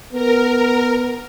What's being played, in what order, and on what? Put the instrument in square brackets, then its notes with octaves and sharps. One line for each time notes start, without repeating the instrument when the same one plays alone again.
[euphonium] B3 [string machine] A#4